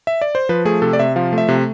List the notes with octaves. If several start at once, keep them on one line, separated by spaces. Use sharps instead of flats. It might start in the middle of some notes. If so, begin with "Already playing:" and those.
E5
D5
C5
F3 B4
A3 G#4
C3 A4
D5
C3 E5
F3 F5
A3
E5
C3